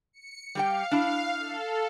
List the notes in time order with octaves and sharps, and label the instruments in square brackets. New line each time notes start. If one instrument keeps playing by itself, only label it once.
[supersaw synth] C#7
[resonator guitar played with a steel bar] G3 G4 G5 [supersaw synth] F5
[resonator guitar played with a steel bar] D4 E4
[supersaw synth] A4